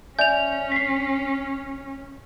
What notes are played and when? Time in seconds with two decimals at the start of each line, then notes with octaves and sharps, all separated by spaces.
0.19 C#4 D5 E5 G#5 G6 F7
0.72 B6 C7